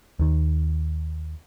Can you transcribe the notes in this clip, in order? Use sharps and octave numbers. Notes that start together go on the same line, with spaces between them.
D#2 D#3